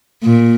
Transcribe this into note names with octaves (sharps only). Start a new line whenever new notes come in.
A#2